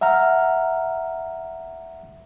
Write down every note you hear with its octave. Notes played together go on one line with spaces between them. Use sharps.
E5 F#5 A#5 F6